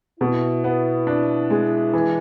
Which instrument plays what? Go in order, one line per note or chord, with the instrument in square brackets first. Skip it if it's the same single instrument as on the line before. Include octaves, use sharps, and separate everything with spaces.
[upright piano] B2 [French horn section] E4
[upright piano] B3
D4
G#3
E3